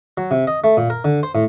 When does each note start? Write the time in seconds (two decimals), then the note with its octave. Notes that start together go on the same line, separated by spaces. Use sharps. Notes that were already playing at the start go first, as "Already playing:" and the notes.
0.17 F#3
0.31 C3
0.47 D#5
0.64 A3
0.77 A#2
0.90 A#4
1.04 D3
1.23 C5
1.35 A2